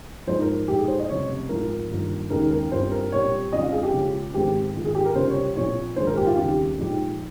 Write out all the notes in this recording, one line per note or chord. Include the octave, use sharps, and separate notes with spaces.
G#2 F3 G#3 D#4 C5
A#4
A#2 G#3 D#4 G4
G#4
C5
D#5
F1 F2 C#3 G3 C#5
G#2 F3 G#3 C4 F4 A#4
G2 D#3 A#3 F4
D#2 C#3 G#3 D#4 A#4
A#4
G2 G3 C4 F4 C5
A#4
A#1 A#2 G3 C4 C#5
F2 C#3 F3 G#3 D#5
F5
G#4
G4
C#2 C#3 G#3 C#4 F4
G#2 D#3 G#3 C4 G4
G#2 D#3 A#3 F4
G#4
G4
A#4
C#2 C3 G3 C4 C5
C#5
A#1 A#2 F3 C4 F4 C#5
A#1 G#2 D#3 G#3 C5
A#4
G4
F4
D#2 C#3 G3 C4 G4
A#2 F3 G#3 D#4